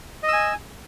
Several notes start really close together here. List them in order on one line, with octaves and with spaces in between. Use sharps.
D#5 E6 G#5